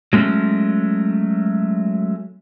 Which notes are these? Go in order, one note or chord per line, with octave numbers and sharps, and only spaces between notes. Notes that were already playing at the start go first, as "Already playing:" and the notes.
F#3 G#3 A3 C#4